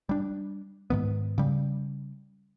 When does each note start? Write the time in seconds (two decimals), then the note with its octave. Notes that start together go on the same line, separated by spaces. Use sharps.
0.09 G3 D4
0.90 G#2 D#3 B3
1.38 C#3 G3